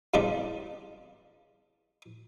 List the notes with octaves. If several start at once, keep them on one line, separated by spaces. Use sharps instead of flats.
E2 G2 C#3 G#3 D4